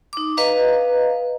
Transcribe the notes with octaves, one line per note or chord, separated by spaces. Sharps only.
D#4 D6
B4 D#5 F5 A#5